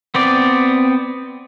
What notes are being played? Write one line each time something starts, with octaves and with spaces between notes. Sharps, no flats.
B3 C4 D5